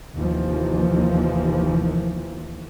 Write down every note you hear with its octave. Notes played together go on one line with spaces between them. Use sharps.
F1 D#2 E3 F3 A#3